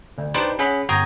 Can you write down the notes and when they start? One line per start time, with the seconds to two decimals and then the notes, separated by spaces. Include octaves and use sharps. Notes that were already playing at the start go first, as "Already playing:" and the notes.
0.18 D2
0.34 D4 D#4 G4 B4 C5
0.59 C#4 G#4 F#5 B5
0.89 G1 F#4 G5 A#5 D#6 G#6